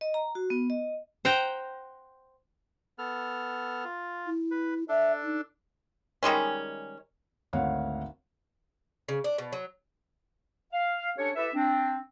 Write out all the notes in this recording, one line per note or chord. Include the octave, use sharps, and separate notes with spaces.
D#5
A#5
F#4
B3
D#5
C5 F#5 G5 A#5
B3 A4 F6
F4
E4
B4
D4 A4 E5
D#4
D#3 G3 G#3 C#4
G#1 D2 C#5 F5 F#5
C#3
D4
B2
F#3
F5
C#4 D4 G4 A4 C#5
E4 G4 A4 B4 E5
C4 D4